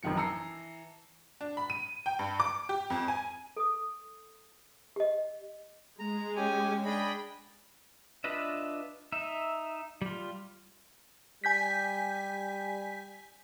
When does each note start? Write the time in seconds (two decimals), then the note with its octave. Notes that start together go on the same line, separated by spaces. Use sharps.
0.03 A1 F#2 C3 D#3 F3 C#7
0.16 E3 A5 A#5 E6 C7 C#7
1.41 D4
1.57 B5
1.70 D#7
2.06 G5
2.19 G2
2.40 D6
2.69 G4
2.90 F2
3.08 G#5
3.56 A4 D#6
4.96 G4 D#5
5.99 G#3 A#5
6.36 C#4 G4 G#5
6.85 D4 G#4 D#5 G5 B5
8.24 D4 F4 B4 D#5 E5
9.12 D#4 E5
10.02 G3 F4
11.44 G3 G#5 G6 B6